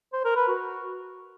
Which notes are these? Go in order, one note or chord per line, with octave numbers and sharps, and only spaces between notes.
C5
A#4
B4
F#4